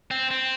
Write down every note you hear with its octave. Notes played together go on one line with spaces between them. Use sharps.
C4
C4